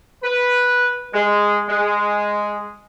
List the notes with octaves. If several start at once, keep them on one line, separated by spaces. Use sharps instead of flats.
B4
G#3
G#3